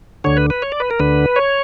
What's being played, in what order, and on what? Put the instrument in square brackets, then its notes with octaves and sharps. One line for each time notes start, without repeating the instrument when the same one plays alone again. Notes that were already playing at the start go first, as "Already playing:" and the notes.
[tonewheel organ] D2 D3 C#5
B4
B4
C#5
D5
B4
A#4
D2 D3 B4
C#5